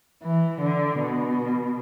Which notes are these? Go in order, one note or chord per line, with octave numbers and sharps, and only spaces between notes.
E3
D3
B2